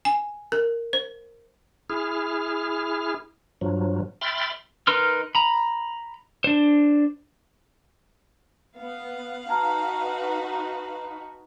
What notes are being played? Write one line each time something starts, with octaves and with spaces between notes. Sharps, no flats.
G#5
A#4
C5
E4 G#4 F6
G2 F3 F#3
E5 G5 B5 C6 F6 A6
D#4 A#4 B4 C6 F6
A#5 B5
D4 C5
B3 F5 F#5
D#4 F#4 B4 A5 A#5 F6